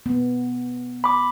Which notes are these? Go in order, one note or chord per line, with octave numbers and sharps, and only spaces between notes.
B3
B5 D6